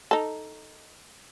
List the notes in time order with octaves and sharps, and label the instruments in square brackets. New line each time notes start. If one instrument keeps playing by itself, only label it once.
[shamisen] D#4 A4